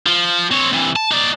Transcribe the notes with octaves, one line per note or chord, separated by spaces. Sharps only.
F3
C4 C#5
C3 E3
A5
D#4 D5